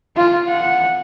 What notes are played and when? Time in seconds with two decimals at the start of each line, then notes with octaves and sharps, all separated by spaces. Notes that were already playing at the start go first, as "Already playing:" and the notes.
0.16 F4
0.48 F#5